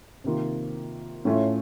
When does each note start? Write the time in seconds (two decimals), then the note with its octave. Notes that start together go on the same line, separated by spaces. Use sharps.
0.24 C3 D#3 A#3 F4
1.25 A2 A3 C#4 F4